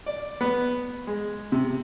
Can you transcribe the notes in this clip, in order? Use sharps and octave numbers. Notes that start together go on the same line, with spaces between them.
D5
B3
G#3
C3